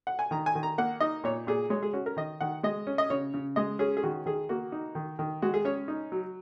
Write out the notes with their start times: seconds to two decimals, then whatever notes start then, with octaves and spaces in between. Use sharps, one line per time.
0.07 F#5
0.19 G#5
0.31 D#3 A#5
0.46 G#5
0.55 D#3
0.63 A#5
0.78 A#3 F#5
1.00 D#4 D#5
1.24 A#2 C#5
1.47 A#2 G#4
1.70 G#3 C#5
1.83 G#4
1.93 C#4 F#4
2.06 A#4
2.17 D#3 D#5
2.41 D#3 F#5
2.63 G#3 D#5
2.87 C#4
2.98 D#5
3.10 C#3 C#5
3.34 C#3
3.56 G#3 D#5
3.79 C#4 G#4
3.97 G#4
4.03 D#3 F#4
4.26 D#3 G#4
4.49 A#3 F#4
4.72 D#4
4.95 D#3
5.19 D#3
5.42 G#3 F#4
5.54 G#4
5.65 C#4 C#5
5.88 D#4
6.12 F#3